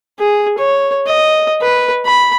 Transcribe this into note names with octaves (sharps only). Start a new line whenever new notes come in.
G#4
C#5
D#5
B4
B5